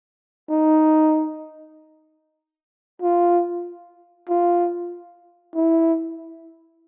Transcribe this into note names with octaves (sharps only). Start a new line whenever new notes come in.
D#4
F4
F4
E4